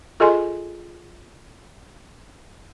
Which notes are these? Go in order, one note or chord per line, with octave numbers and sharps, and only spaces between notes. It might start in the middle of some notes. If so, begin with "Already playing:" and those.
F4 G#4 A4 D#5 G#5 C6